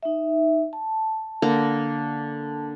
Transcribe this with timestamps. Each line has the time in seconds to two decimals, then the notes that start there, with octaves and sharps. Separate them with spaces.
0.03 D#4 E5
0.73 A5
1.42 D3 A#3 A#5